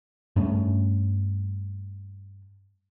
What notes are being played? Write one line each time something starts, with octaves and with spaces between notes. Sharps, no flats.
G2 A3 C#4